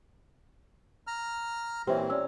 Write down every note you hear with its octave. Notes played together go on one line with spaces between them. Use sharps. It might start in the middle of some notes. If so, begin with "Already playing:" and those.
A#5 F6
A#2 E3 C4 C#4 G4 C5 E5
C#4 D5 E6